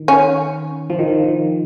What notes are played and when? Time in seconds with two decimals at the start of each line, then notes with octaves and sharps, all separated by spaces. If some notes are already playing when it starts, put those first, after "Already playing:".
Already playing: D#3
0.08 C#4
0.90 F3
0.99 D#3
1.08 F3
1.24 D#3